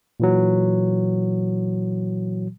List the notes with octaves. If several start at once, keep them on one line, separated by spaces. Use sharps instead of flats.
A#2 E3 F#3